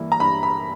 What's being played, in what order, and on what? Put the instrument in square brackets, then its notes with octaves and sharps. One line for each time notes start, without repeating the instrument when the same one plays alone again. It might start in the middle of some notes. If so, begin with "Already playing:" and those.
Already playing: [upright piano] G2 E3 G3 A#3 E4
A#5
G2 B5
B5